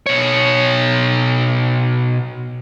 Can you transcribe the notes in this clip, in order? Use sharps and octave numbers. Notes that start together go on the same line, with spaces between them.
B2 C#5